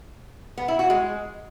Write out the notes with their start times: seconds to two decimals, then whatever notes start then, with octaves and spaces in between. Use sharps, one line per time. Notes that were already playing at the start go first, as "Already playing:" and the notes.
0.58 B3
0.68 E4
0.79 F#4
0.90 G#3